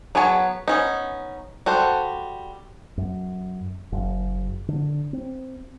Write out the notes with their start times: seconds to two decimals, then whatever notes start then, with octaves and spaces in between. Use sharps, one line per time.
0.15 F#3 B3 G#4 C#5 A5
0.68 B3 C#4 D#4
1.66 G3 F#4 A4 C5
2.97 F#2
3.92 F#1
4.68 D3
5.13 C4